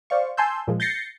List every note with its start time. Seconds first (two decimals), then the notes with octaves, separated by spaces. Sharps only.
0.10 C5 D5 F5 C#6
0.37 G#5 A5 C6 E6 G6
0.68 A#2 F3 G#3
0.80 G6 A6 A#6 C7 C#7